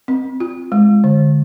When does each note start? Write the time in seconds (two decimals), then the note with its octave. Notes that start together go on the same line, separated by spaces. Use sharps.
0.08 C4
0.40 F4
0.72 G#3
1.04 D3